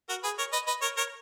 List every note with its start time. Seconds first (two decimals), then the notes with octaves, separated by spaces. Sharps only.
0.09 F#4 A#4
0.23 G#4 B4
0.38 A#4 C#5
0.53 B4 D#5
0.67 B4 D#5
0.82 A#4 C#5
0.97 A#4 C#5